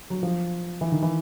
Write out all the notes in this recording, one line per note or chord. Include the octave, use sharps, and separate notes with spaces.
F#3
F3
E3
D#3
E3